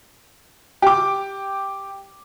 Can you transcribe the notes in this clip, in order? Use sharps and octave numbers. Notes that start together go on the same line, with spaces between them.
G4 D6